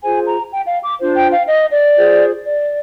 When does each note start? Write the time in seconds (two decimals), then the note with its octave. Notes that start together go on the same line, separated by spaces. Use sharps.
0.02 F4 G#4 C5 G#5
0.26 A#5
0.51 G5
0.66 F5
0.83 D6
1.00 D4 F4 C5
1.16 G5
1.32 F5
1.48 D#5
1.73 D5
1.97 F4 G#4 C5
2.45 D5